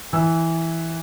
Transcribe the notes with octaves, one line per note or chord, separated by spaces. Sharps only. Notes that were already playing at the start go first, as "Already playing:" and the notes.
E3 E6